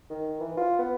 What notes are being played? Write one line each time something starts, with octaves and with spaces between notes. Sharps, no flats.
D#3
E3
F4
B3